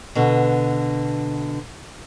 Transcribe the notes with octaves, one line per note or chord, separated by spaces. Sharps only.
B2 D3